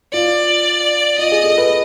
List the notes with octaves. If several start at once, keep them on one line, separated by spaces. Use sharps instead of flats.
F4 D5
F4 D#5
G#4
A4
B4